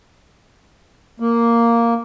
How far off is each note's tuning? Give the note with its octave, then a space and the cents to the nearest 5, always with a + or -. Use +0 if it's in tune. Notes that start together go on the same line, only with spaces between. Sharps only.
A#3 -5